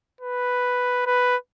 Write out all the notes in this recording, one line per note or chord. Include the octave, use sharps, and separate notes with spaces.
B4
B4